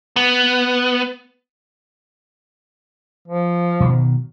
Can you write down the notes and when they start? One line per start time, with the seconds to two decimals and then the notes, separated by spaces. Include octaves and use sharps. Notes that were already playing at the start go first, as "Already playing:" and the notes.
0.16 B3
3.28 F3
3.80 B2 D#3 F#3